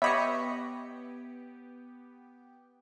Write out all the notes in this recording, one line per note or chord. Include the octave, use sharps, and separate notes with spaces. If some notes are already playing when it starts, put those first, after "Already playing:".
B3 G4 C#5 D#5 E5 B5 C#6